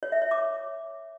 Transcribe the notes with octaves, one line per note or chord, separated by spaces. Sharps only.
C#5
E5
C#5
D6